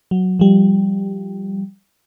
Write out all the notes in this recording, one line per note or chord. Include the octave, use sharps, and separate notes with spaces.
F#3
F3 G3